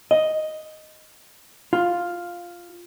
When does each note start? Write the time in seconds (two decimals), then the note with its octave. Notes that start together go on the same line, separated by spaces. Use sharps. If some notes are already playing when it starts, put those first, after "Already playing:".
0.11 D#5
1.73 F4